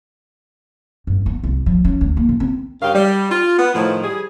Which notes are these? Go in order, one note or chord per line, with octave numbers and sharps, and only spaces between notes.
G2
B3
C2
F3
C#4
D2
A#3
C#3
C4
G2 C#3 G4 A#4 F5
G3
F4
B3
A2 D#3 F3
G3 G#4